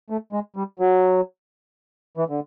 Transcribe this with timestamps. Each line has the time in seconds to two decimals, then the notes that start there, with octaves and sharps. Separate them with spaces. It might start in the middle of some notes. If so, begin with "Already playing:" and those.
0.10 A3
0.33 G#3
0.56 G3
0.79 F#3
2.17 E3
2.29 D3